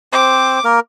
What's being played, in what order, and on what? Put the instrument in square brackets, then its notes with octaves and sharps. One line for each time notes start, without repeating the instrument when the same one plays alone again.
[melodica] C4 C5 [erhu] D6
[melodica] A#3 A#4